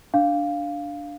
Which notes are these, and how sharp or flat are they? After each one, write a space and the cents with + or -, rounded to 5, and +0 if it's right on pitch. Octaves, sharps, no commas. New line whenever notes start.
D4 +0 F5 +0